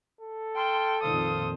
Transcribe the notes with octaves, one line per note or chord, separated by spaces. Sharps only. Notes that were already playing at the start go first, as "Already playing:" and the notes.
A4
G5 A5 C6 F6
F2 A#2 D#3 C5 F5 D#6